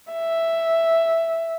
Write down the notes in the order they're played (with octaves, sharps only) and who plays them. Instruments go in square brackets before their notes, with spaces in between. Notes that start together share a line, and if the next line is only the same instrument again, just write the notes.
[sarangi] E5